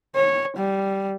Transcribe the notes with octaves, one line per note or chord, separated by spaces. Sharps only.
C#5
G3